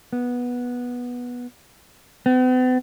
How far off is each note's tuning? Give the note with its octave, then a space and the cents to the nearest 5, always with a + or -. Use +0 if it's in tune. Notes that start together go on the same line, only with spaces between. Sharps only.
B3 -10
B3 +45